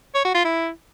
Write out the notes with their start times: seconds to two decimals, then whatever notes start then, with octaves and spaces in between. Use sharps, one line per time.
0.15 C#5
0.25 F#4
0.35 F4
0.45 E4